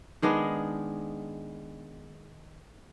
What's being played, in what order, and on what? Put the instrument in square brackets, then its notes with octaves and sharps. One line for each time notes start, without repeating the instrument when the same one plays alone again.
[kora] D#3 G#3 B3 D4